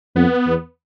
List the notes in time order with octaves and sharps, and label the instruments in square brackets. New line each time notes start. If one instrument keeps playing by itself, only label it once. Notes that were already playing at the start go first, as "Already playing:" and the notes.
[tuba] F2 [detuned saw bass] B3
[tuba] E2